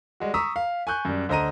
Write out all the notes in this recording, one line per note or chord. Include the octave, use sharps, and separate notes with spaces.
G3 G#3 F#4
A#5 C#6 D#6 E6 B6
F5
G#5 C#6 F#6 G6
F#2 G3
D2 C5 D#5 A#5 D#7